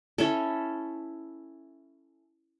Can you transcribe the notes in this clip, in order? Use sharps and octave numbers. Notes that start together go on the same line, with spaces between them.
C#4 E4 A4